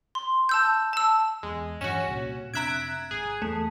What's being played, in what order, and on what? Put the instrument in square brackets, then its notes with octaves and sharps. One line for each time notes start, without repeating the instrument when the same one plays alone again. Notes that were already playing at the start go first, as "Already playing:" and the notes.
[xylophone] C6
A5 E6 G6
A5 E6
[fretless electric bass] E2 [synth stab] G#3
[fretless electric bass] G2 E3 [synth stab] C#4 F#4 [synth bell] E7
[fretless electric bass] C2 A#2
[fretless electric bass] F1 C3 D4 [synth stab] E5 D7 [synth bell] A#5 F#6 G#6
[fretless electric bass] G#1 [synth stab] G#4
[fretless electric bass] E2 [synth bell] A3